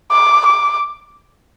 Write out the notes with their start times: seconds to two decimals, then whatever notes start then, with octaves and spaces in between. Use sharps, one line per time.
0.11 D6
0.46 D6